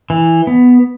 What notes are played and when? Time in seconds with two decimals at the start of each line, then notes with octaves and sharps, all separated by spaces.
0.10 E3
0.47 B3